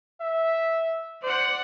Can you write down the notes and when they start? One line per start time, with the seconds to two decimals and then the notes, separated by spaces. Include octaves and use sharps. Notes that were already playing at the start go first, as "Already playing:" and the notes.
0.21 E5
1.23 C5 D5 F#5